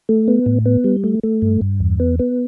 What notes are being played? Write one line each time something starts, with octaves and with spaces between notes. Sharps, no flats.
A3
B3
A2
B3
G3
A3
A3
G2
G2
E2
B3
B3